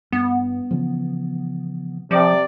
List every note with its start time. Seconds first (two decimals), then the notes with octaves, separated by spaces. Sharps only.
0.12 G2 B3
0.71 C#3 E3 F3
2.11 C3 F3 D5